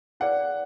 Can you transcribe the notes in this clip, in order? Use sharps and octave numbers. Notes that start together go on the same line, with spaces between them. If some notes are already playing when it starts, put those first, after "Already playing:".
E4 G#4 B4 D5 F#5